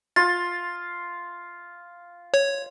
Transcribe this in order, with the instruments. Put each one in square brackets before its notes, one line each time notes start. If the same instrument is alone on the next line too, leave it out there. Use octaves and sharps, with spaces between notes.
[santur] F4 [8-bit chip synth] A6
[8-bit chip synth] C#5